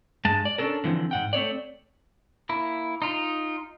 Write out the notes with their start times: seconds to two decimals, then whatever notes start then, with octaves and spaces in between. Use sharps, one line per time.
0.25 G2 G#3 A5
0.45 D5
0.58 C#4 D4 A4 A#4
0.84 D3 E3 F3 C4
1.11 G#2 F#5 G5
1.33 A3 C4 C#5 D5
2.49 A#3 E4
3.02 D#4 F4